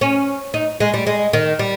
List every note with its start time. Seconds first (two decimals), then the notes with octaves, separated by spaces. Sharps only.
0.01 C#4
0.54 D#4
0.80 G#3
0.94 G3
1.07 G#3
1.33 D#3
1.59 G3